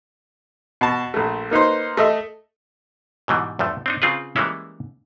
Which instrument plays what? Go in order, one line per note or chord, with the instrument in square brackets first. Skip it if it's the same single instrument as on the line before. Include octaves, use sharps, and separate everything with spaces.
[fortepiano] B2 A5
A#1 A3
A#3 D#4 B4 C5
A3 D#5 E5
[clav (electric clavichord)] G#2 B2 E3 G3
E2 G2 F3 A3
C4 D4 D#4
C#3 C4 F4 G#4 B4
E3 G3 G#3 A#3 C#4 E4